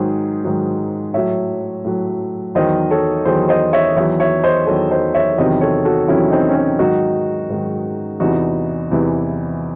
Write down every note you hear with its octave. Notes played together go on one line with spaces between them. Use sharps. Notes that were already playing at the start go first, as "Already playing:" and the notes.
Already playing: G#2 D#3 F#3 G#4 C5
G#2 D#3 F#3
A2 F#3 C#5 E5
A2 F#3
E2 D#3 F#3 C5 D#5
A4 C#5
E2 D#3 F#3 G#4 C5
C5 D#5
C#5 E5
E2 D#3 F#3 C#5 E5
C#5 E5
C5 D#5
E2 D#3 F#3 A4 C#5
C5 D#5
C#5 E5
E2 C3 D#3 F#3 C5 D#5
A4 C#5
F#4 A4
E2 C3 D#3 F#3 C#4 E4
C4 D#4
C#4
C4 D#4
G#2 D#3 F#3 D#4 F#4
G#2 D#3 F#3
E2 C3 E3 D#4 F#4
E2 C3 E3